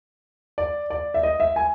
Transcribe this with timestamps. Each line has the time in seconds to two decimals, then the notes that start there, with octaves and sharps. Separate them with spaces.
0.58 D5
0.90 D5
1.14 E5
1.23 D#5
1.40 E5
1.56 G#5